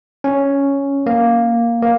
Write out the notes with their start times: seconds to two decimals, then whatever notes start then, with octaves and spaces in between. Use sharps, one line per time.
0.24 C#4
1.06 A#3
1.82 A#3